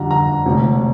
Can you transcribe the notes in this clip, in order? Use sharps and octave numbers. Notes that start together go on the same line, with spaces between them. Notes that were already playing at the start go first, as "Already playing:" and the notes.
Already playing: F2 D3 G3 A#5
A#5
E1 D2 C3